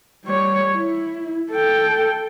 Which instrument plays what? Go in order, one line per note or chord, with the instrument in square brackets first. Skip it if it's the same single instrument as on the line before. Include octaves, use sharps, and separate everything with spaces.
[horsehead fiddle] G3 C#5
E4
A4 G5